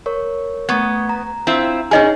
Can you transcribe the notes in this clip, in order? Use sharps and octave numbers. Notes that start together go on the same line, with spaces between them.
A#4 C#5 C#6
A3 B3 C#6 G#6
A#5
C4 E4 F4
C#4 D#4 G#4 C#5 D#5 G#5